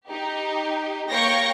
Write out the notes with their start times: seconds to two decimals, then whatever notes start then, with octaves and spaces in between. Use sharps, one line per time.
0.11 D#4 G4
1.11 A#3 C#5 F5 G5 C#6 A#6